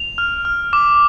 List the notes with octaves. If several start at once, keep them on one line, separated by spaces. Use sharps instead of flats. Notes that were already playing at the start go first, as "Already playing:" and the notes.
Already playing: F7
F6
F6
D6